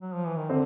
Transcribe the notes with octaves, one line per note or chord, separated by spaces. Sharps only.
F#3
F3
E3
D#3
D3 C4